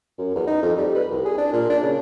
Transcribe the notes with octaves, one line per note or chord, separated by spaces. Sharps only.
F#2
E2
D#4
F2
G3
B4
C2
G#4
D4
A#2
D4
C#3